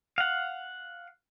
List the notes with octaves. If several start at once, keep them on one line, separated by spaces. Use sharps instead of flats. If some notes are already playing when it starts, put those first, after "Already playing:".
F5 F#5